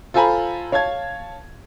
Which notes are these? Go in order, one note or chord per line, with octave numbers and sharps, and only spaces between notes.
F4 A4 C5 G#5 A#5 B5
C#5 F5 A5 G#6